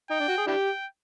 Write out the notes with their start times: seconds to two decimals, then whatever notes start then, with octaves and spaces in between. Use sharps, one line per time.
0.10 D#4 G5
0.20 D4
0.28 F#4
0.38 G#4
0.47 D4 E4 G4 G5